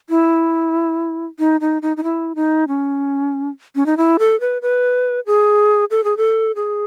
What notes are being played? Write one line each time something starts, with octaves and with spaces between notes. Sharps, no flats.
E4
D#4
D#4
D#4
D#4
E4
D#4
C#4
C#4
D#4
E4
A4
B4
B4
G#4
A4
G#4
A4
G#4